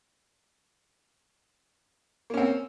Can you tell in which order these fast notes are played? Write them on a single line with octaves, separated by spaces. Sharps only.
A#3 C#4 C4